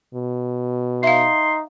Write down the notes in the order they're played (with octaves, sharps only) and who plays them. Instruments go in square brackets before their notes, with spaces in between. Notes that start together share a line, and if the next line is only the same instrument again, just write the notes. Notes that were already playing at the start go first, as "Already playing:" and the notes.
[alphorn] B2
[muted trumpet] D#4 [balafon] E5 F5 [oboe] C6